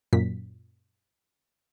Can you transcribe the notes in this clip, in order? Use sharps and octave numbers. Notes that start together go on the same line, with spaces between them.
F#2 A#2 B6